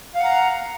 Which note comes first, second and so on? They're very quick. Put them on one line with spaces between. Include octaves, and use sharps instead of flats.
F5 F#5 A#5